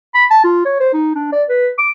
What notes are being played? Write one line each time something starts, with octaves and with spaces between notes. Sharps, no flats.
B5
A5
F4
C#5
C5
D#4
D4
D5
B4
D6